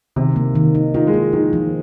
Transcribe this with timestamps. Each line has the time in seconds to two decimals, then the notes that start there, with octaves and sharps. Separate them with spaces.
0.16 C3 D#3
0.36 A#3
0.55 D#3
0.75 D#4
0.94 D#3 F4
1.07 G#3
1.14 A#3
1.33 D#3 F3
1.53 F3